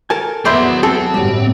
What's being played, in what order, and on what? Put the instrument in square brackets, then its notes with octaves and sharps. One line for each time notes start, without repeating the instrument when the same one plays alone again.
[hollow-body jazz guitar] A4 A#4 G#5 [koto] A5
[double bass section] E2 F#3 B3 [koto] E4 C5 D5 [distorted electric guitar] G#4 B5
[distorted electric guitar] C4 [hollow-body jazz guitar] G#4 [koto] A4
[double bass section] G1 A2 [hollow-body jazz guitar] F#3 G3